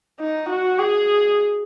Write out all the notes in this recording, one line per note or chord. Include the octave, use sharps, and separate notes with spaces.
D#4
F#4
G#4